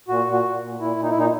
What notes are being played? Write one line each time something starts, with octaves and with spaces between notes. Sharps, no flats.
A#2 F#4
A#2
F#4
A#2
A#2
A#2 E4
A#2
D#4
E4
A#2 D#4